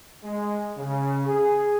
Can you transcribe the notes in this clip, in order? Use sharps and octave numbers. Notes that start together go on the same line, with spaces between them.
G#3
C#3
G#4